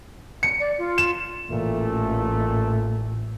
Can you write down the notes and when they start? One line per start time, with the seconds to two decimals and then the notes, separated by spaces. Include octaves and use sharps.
0.43 C#7
0.60 D5
0.78 F4
0.98 E7
1.50 A1 A#2 A3